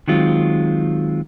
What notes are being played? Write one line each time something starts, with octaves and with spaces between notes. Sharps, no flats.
D#3 F#3 G#3 C4 F4